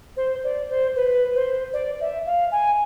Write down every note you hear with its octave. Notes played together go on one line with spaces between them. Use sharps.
C5
D5
C5
B4
C5
D5
E5
F5
G#5